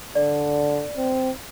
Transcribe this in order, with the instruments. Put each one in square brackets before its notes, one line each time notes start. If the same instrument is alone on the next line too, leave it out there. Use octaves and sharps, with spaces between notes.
[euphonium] D3 [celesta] D5
[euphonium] C4